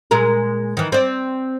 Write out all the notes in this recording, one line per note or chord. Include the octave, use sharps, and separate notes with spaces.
A#2 G#3 A#4
D#3 E3
C4 D5